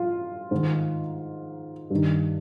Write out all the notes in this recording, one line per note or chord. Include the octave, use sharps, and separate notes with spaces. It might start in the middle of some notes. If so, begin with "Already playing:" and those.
Already playing: F4
G#2 D#3
G2 D#3